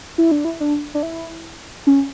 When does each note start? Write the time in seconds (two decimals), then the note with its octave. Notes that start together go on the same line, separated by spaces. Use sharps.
0.18 E4
0.31 D4
0.45 E4
0.60 D4
0.94 D4
1.03 E4
1.87 C#4